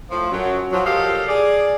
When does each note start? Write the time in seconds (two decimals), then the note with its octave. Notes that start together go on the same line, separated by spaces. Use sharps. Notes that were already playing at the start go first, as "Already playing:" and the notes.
0.11 A2 F3
0.31 F#2 F#3
0.72 F3 F#3
0.86 A#2 F3 G4 A4 D#5 F5
1.28 G#4 D5